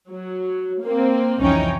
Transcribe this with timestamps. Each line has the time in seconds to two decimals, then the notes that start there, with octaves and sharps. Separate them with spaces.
0.10 F#3
0.82 A#3 C4
1.40 C2 F2 E3 C#4 D#4 G5